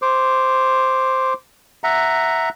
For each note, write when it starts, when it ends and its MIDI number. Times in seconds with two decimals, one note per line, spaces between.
0.02 1.34 72
0.02 1.34 86
1.84 2.49 76
1.84 2.49 78
1.84 2.49 82